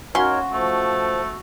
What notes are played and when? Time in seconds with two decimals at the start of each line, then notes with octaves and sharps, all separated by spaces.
0.15 C#4 D#4 F#4 A#4 C#5 C6
0.53 F3 A3